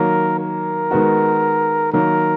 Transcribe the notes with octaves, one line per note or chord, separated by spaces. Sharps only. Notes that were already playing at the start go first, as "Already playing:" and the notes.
Already playing: D#3 F#3 A#3 A#4
A#4
D#3 G#3 B3 F#4
D#3 F#3 A#3 A#4